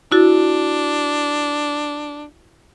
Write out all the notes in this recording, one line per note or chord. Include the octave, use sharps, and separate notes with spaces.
D4 E4 F#4 A6